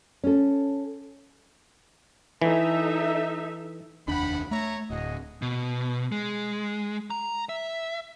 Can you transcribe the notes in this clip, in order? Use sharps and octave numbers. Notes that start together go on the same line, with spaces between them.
C#4 A4
E3 D#4 A4 E5
F1 D#2 D4 F#5 G5 B5
A3 C#5 E5 A#5
D1 F#4 G#4 D#5
B2
G#3
A#5
E5